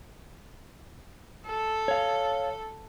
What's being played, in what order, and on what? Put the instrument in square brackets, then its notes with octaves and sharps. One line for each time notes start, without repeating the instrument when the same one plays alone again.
[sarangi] A4
[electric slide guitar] C#5 F5